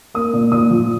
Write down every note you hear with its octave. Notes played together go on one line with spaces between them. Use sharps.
A#3 D#6
A#2
A#2 D#6
F3